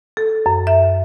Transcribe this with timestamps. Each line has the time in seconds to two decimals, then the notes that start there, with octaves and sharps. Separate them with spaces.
0.17 A4
0.46 F#2
0.67 E5